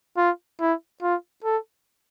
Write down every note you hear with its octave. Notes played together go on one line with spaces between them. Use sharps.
F4
E4
F4
A4